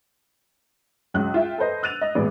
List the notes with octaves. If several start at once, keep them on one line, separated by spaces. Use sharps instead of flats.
C#2 F#3 F#6
F4 E5 G5
A4 B4 C5 D#5
E6 F#6 A6 D#7 F7
D#5
A1 A#2 G#3 B3 D5